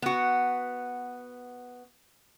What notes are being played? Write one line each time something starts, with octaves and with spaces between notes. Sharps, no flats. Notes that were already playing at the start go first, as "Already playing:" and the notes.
B3 F#4